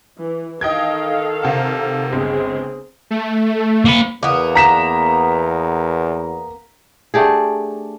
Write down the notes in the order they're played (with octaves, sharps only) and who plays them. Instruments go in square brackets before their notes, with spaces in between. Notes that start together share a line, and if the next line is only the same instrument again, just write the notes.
[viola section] E3
[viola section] D#3 A4 F5 [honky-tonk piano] D#5 G5 G#6
[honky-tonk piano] C3 F#5 E6
[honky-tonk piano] G1 C#2 [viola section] C4 G#4
[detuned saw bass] A3
[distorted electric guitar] A#3 B5
[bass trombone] E2 [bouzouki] A#3 B3
[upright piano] A#5 B6 E7
[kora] A3 D4 G4 G#4